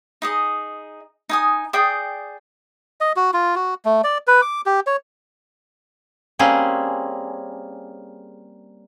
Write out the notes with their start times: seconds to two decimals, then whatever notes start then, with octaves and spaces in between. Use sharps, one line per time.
0.22 D#4 G#4 D#5
1.29 D#4 G#5 D#6
1.73 G#4 D5 G5 D#6
3.01 D#5
3.16 F#4
3.33 F4
3.55 F#4
3.85 A3
4.04 D5
4.27 B4
4.42 D6
4.66 G4
4.87 C#5
6.39 G3 A#3 C4 C#4 G#4